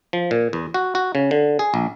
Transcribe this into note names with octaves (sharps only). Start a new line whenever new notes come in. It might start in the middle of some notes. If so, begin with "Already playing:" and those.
F3
A#2
E2
F#4
F#4
C#3
D3
G#4
A#1